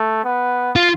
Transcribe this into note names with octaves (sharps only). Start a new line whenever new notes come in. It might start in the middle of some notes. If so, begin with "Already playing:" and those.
Already playing: A3
B3
F4